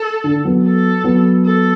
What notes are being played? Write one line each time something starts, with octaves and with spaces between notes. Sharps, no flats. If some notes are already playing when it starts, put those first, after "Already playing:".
Already playing: A4
D3
F#3 B3
A4
F#3 B3
A4